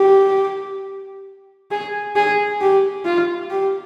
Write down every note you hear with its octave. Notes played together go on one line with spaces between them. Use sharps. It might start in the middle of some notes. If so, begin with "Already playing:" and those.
Already playing: G4
G#4
G#4
G4
F4
G4